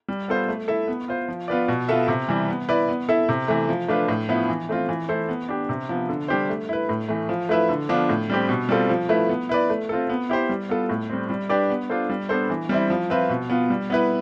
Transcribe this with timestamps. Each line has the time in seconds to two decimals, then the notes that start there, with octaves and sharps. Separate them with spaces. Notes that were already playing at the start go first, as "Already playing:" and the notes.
0.08 G3
0.28 B3 F4 A4 C5
0.48 A3
0.68 E4 A4 E5
0.88 B3
1.08 F4 C5
1.28 F3
1.48 B3 F4 B4 D5
1.68 B2
1.89 B3 F4 A4 E5
2.08 C3
2.28 E3 G3
2.49 B3
2.69 E4 B4 D5
2.89 B3
3.09 E4 A4 E5
3.29 C3
3.48 E3 A3
3.69 F3
3.88 A3 D4 F4 B4
4.08 A2
4.29 F3 B3 E4
4.48 E3
4.69 A3 C4 F4
4.89 E3
5.09 A3 E4 A4 C5
5.29 B3
5.49 D4 G4
5.69 C3
5.89 F3 B3
6.09 D3
6.28 G3 D4 G4 C5
6.49 A3
6.69 E4 B4
6.89 A2
7.08 E3 A3
7.29 F3
7.49 A3 E4 B4 E5
7.69 D3
7.89 F3 B3 D4 F4
8.09 A2
8.30 G3 C4 G4
8.49 B2
8.69 G3 C4 F4 A4
8.89 F3
9.09 A3 E4 B4
9.29 B3
9.49 E4 B4 D5
9.70 A3
9.89 C4 F4 A4
10.09 B3
10.29 E4 G4 C5
10.49 G3
10.69 B3 F4 A4
10.89 A2
11.10 G3 C4
11.30 G3
11.49 D4 G4 B4 D5
11.70 B3
11.90 D4 F4 A4 C5
12.10 G3
12.29 B3 D4 A4 C5
12.50 E3
12.69 G3 C4 E4
12.90 F3
13.10 C4 F4 B4 E5
13.29 B2
13.50 B3 F4
13.70 G3
13.90 B3 E4 B4